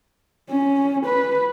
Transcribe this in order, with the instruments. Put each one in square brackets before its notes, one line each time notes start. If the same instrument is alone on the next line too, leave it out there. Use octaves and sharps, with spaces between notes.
[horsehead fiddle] C#4
B4